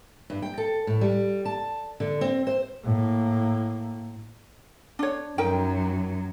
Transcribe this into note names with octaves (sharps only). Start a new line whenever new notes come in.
G2
G5
A4
A2
G3
A5
D3
C4
C5
A2 A#3
D4 C#5
F#2 F#3 D#4 A#4 G5